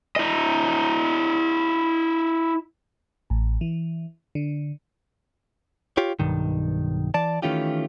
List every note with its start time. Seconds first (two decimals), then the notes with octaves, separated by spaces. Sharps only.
0.16 E4 D#5
3.30 A1
3.61 E3
4.35 D3
5.97 F4 G4 C#5
6.19 B1 G2 D#3
7.14 E3 D5 A5
7.42 D#3 E3 A3 C#4 F4 G4